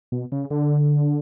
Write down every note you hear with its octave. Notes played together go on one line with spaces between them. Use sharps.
B2
C#3
D3